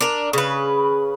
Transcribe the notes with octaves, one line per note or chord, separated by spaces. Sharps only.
D4 A#4
C#3 B4